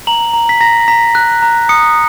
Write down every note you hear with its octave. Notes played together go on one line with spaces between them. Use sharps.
A#5 F#7
A#5
B6
A#5 A#6
A#5 B6
F#6
A#5
D#6 C#7